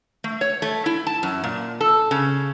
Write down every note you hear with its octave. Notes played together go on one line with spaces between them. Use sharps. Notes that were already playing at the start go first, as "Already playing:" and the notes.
A3
C#5
A3
E4
A5
F#2
A#2
A4
C#3